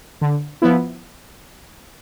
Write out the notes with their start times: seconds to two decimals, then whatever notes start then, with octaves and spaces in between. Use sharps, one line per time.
0.21 D3
0.62 F3 B3 E4